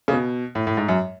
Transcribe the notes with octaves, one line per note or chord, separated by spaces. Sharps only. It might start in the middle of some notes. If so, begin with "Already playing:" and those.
C#3
B2
A2
A2
G#2
F#2